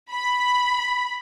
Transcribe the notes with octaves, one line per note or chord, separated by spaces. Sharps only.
B5